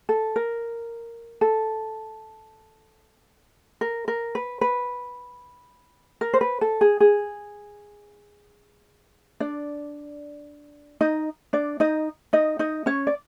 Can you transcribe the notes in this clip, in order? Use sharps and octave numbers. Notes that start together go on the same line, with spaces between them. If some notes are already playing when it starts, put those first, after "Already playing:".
A4
A#4
A4
A#4
A#4
B4
B4
A#4
C5
B4
A4
G#4
G#4
D4 D5
D#4 D#5
D4 D5
D#4 D#5
D#4 D#5
D#4 D#5
C#4 C#5
D5